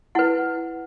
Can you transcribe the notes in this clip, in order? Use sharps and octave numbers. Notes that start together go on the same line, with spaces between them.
E4 B4 F#5